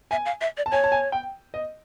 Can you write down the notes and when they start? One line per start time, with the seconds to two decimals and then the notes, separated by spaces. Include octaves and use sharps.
0.11 E5 G#5
0.26 F5
0.41 E5
0.57 D5
0.66 A5
0.71 C#5 G#5
0.84 A5
0.92 G#5
1.12 G5
1.54 D#5